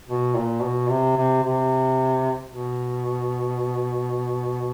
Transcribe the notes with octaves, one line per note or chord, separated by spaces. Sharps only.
B2
A#2
B2
C3
C3
C3
B2